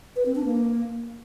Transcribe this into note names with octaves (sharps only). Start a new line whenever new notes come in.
B4
C4
D4
A#3